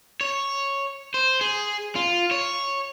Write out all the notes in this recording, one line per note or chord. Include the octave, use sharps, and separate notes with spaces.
C#5
C5
G#4
F4
C#5